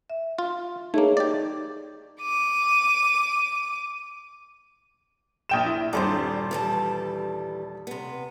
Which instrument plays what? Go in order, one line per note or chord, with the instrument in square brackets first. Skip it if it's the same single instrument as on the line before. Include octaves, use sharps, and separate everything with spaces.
[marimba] E5
[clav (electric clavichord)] F4
[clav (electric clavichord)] A3 A#3 [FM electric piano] D#4 [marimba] G#4 C#5
[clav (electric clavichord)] G4 D5
[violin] D6 D#7
[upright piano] A#1 G5 E7
E4
[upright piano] D#1 G2 C5 [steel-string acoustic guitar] C4 G4 D5
[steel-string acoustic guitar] E3 G3 A4
C3 B3